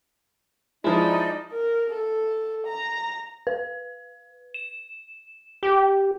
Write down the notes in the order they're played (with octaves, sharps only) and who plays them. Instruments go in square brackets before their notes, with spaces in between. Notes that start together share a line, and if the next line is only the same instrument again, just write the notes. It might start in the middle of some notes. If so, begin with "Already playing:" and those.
[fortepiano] F3 G#3 [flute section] D#4 D5 D#5 [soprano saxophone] E4
[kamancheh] A#4
A4
A#5
[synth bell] B4
E7
[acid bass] G4